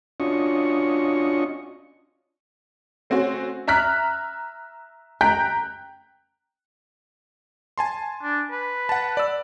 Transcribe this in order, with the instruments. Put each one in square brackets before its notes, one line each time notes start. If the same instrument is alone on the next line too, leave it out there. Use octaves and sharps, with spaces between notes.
[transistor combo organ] C#4 D4 F4 F#4 D#5 C#6
[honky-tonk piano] A3 C4 C#4 F#4
E5 A#5 F6 F#6 B6
G5 A#5 F#6 G6 B6
[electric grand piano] G#5 A5 C6
[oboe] D4
B4
[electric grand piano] F#5 A5
D5 E6